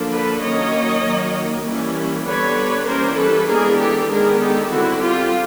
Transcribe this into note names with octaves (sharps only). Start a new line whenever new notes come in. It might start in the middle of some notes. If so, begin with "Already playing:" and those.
Already playing: D3 F3 A#3 D4
A4 B4
D#3 F#3 A#3 C#4 C#5 D#5
D#3 F#3 A#3
E3 G3 A#3 C#4
D3 G3 B3 D4 B4 C#5
E3 G3 A#3 C#4 A#4 C5
A4 B4
E3 G#3 B3 D4 G#4 A#4
G4 A4
D#3 G#3 B3 D4 G#4 A#4
G4 A4
D3 G3 C4 E4 F#4
F4 G4